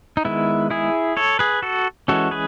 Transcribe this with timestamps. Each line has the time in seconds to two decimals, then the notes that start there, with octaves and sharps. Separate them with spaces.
0.17 D#4
0.25 D#3 G#3 B3 E4
0.70 E4 G#4
1.17 A4 C#5
1.39 G#4 B4
1.62 F#4 A4
2.08 E3 G#3 C#4 F#4 A4
2.31 G#4 B4